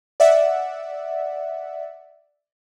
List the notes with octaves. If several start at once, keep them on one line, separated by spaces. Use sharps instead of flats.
D5 E5 F#5